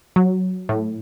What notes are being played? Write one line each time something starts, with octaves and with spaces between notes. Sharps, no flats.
F#3
A2